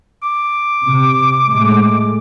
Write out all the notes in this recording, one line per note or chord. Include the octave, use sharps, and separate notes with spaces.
D6
C3
A2 G#3 A3